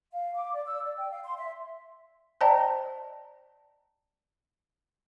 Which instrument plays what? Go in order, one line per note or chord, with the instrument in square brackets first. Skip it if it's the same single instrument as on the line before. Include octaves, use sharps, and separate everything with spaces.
[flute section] F5
D6
D5
E6
D5
G5
F5
C6
E5
[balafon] C5 D5 D#5 G5 A5 A#5